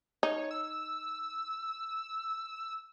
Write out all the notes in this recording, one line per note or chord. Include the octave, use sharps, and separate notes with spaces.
D#4 C#5
E6